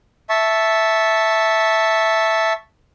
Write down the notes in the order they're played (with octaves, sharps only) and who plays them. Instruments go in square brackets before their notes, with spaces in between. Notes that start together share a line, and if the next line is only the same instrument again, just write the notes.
[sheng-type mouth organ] E5 A5 C#6